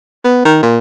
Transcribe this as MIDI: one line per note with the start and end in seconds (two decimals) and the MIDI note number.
0.24 0.41 59
0.45 0.60 51
0.63 0.79 46